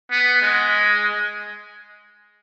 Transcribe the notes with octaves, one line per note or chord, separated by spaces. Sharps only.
B3
G#3